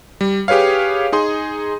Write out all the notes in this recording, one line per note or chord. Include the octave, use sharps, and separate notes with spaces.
G3
G4 G#4 B4 C#5 F5
D#4 G#4 C6